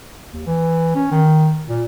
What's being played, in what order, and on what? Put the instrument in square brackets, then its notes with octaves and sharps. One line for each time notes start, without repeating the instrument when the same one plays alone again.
[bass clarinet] D#2
E3
C#4
D#3
A#2